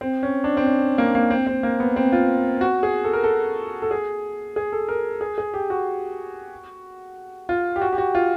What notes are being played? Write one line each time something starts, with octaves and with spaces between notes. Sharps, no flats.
C4
C#4
D4
C4
C#4
A#3
A#3
C4
C4
A#3
B3
C4
F4
F#4
G#4
A4
A#4
A4
A4
G#4
G#4
A4
A#4
G#4
G#4
G4
F#4
F4
G4
F#4
G4
F#4
F4